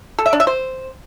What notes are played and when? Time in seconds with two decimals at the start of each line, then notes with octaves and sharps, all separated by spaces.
0.19 A4
0.26 E5
0.33 D4
0.40 E5
0.47 C5